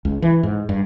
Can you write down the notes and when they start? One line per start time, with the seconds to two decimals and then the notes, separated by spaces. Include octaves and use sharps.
0.05 C#2
0.22 E3
0.43 G#2
0.69 G2